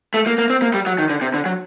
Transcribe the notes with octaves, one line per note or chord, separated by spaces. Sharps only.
A3
A#3
A#3
C4
A#3
G3
F#3
D#3
D3
C3
D3
F#3